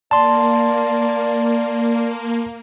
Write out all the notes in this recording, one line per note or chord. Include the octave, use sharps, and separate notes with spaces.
A#3 D5 A5 C6